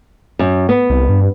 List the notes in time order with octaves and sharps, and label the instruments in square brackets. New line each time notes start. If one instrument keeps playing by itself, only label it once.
[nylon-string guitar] F#2
B3
[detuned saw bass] C2
G2